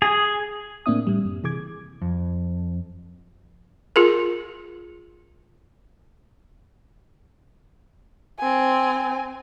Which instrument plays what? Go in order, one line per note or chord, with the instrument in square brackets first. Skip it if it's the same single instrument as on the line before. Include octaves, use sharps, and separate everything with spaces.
[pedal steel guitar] G#4
[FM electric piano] A2 A#3 C4 D4 E5 D#6
A2 G3
F#2
C3 E3 G#4 D6 G#6
[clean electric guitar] F2
[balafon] F4 G#4 A#4
[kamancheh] C4 G#5